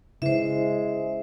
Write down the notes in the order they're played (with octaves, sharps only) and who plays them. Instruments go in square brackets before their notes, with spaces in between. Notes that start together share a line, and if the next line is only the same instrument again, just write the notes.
[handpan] C#3 E4 B4 [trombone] G#3 [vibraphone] C5 E5